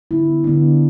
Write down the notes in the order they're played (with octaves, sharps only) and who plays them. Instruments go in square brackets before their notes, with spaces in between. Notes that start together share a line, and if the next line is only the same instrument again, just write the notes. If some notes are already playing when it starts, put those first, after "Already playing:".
[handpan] D3 B3 D4 E4
D3 B3 D4